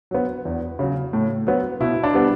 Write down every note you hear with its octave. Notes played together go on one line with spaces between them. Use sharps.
F#3 B3
E2
C#3 F#3
A2
F#3 B3
B2 E4
D4
G3 B3